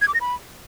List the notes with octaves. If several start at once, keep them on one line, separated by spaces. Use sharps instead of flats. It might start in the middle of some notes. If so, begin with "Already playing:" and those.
G#6
D6
A#6
B5